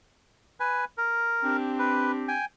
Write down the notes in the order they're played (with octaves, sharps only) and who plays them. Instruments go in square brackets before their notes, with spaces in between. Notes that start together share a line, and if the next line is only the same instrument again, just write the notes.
[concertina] B4 G#5
A#4
[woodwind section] C4 D4 G4
[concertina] B4
G5 G#5